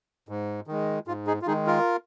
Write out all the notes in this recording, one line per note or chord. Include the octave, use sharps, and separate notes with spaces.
G#2
D#3 G#3
G#2 F4
D#4 G#4
F4
D#3 G#3 D#4 G#4
F4 A#4